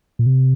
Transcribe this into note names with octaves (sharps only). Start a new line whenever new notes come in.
A#2
C3